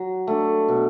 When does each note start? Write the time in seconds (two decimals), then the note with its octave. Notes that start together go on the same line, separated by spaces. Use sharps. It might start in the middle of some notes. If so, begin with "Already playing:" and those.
Already playing: F#3
0.27 A3 D4
0.68 B2